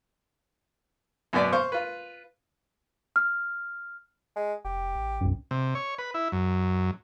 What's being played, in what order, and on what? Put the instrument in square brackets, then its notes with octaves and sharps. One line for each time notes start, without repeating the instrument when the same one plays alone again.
[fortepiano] F#2 B2 B3 D5
C5 F5 C#6
F4 B4
[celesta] F6
[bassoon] G#3
[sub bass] F1 [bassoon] G4
[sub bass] A1
[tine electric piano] B1 F#2
[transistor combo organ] C3
C#5
B4
E4
F#2